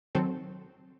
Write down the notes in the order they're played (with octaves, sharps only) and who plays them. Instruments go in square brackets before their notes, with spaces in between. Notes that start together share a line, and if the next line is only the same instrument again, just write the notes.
[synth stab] D#3 F#3 C4 A4